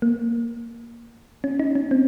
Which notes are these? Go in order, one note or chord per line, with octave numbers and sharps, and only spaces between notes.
A#3
C#4
D#4
C#4
C4